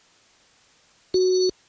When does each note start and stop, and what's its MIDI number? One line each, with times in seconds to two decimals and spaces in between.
1.14 1.49 66